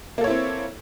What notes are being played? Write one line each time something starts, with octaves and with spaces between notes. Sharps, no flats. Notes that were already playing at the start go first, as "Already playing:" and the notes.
A#3 C4 E4 A4 C#5